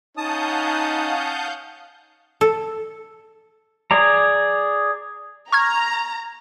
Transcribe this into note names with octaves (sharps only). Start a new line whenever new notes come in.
C#4 D#4 F5 F#5 A5 D#6 G6
A4
G#4 D5 A#5
A#5 C#6 F6 G#6